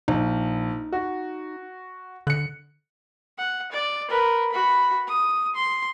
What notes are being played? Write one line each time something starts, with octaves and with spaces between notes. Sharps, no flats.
A#1 D#4
F#4
D3 F#6 C#7
F#5
D5
A#4 B4
F#4 B5
D#6
C6